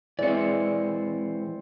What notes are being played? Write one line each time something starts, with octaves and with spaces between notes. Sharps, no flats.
E3 G#3 C4 D5 C#7